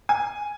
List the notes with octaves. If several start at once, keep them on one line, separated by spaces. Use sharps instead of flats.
G#5